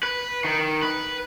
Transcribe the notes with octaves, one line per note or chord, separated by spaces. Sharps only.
B4
D#3
B4